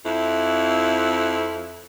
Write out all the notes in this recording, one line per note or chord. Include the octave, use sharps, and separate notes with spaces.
F2 E4